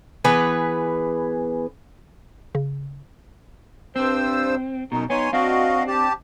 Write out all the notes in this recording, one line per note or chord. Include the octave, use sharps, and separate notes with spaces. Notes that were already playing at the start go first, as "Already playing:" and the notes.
E3 B3 G#4 B4
C#3
G2 C4 C5 E6
F#2 B2 D#4
B3 D#4 C#5 G#5 C6
C4 D4 F#4 D#5 F5
G4 A5